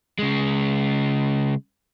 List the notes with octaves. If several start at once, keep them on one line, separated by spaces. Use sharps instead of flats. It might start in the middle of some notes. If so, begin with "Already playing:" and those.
C#3 G#3